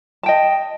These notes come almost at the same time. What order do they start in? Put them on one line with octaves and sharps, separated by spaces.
A5 G5 D#5